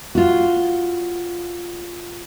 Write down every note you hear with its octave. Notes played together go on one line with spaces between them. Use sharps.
F4 F#4